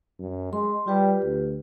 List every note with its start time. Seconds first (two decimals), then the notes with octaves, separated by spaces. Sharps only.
0.19 F#2
0.53 G#3 C6
0.87 G3 F4 G4 B4
1.23 D2